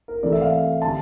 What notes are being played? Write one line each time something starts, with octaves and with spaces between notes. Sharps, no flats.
A#4
C3 E3 A3 D5
E5
F5
D3 G3 A5